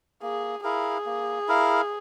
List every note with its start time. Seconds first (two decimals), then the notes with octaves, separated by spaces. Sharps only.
0.22 A#3 G#4
0.64 E4 G#4 A#4 F5
1.06 A#3
1.48 E4 A#4 F5